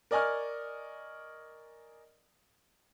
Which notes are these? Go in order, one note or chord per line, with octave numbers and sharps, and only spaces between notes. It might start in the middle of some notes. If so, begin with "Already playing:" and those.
A#4 D5 D#5 G#5 C#6 F6